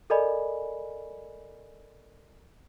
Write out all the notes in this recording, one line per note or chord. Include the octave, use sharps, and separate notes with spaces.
A4 A#4 D5 D#5 G#5 B5